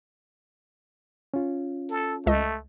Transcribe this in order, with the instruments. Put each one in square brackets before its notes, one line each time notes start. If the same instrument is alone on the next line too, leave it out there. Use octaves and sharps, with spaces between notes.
[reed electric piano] C#4 F4
[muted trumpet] A4
[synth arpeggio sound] C#2 D#5 [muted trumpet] A3